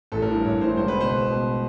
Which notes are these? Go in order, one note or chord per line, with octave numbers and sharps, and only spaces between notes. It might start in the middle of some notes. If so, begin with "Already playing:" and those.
A1 A4
A#4
G2 E3
A1 C#5
G2 E3 C5
C#2 C5
B4
B2
C5
C#2
B2